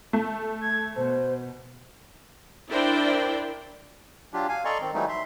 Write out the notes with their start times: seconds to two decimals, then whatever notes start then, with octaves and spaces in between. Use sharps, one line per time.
0.13 A3
0.62 G#6
0.96 B2 C5
2.69 D4 E4 A#4 C5 D5 G5
4.33 F#3 D4 F4 G4
4.49 F5 G#5
4.65 A4 D5 D#5 A#5 C6 C#6
4.81 D#3 C4
4.94 E3 F#3 G3 A3 D#4
5.09 E5 C6